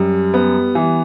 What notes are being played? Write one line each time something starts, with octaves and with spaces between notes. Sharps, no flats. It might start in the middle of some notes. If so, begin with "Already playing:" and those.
Already playing: F#2 G3
B3
E3